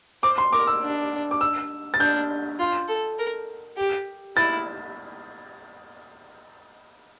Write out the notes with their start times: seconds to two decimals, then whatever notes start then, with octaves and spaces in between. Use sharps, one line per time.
0.23 C5 D6
0.38 C6
0.52 A#4 D6
0.67 E6
0.83 D4
1.31 D6
1.41 E6
1.94 A6
2.00 D4 G6
2.59 F4
2.88 A4
3.19 A#4
3.77 G4
4.36 E4 A6